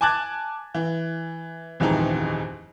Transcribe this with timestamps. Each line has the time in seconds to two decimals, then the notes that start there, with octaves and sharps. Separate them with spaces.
0.01 G#5 A5 D6 F#6 G#6 A6
0.75 E3
1.80 D#1 F2 G#2 E3 D#4